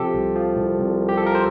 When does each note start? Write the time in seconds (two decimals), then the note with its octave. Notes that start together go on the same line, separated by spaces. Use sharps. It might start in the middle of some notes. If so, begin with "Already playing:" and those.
Already playing: C3 F3 G4 A4
0.14 C2
0.36 F3
0.57 C2
0.79 C2
1.01 C2
1.09 G4
1.17 A4
1.22 F3 A#4
1.35 C5